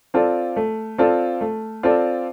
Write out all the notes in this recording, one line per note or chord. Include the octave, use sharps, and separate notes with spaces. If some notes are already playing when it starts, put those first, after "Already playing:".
C4 F4 A4 D5
A3
C4 F4 A4 D5
A3
C4 F4 A4 D5